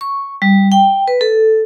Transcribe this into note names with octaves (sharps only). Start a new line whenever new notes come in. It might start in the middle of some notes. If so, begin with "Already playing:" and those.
C#6
G3
G5
B4
A4